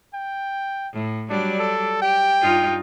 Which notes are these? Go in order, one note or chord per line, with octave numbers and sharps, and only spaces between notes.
G5
A2
F#3 G3 D4 D5
A4
G4 G5
G2 D#4 F4